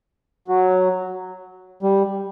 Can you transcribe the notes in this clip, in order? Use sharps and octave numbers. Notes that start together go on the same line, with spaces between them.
F#3
G3